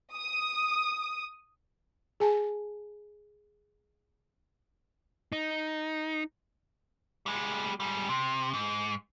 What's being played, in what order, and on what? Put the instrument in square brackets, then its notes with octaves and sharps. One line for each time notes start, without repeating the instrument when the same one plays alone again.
[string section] D#6
[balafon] G#4 G#5 A5
[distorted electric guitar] D#4
[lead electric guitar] G3 G#3
G#2 G3
C3
G#2